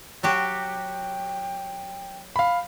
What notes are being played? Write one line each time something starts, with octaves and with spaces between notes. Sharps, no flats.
F#3 F#4 G4 G5
F5 B5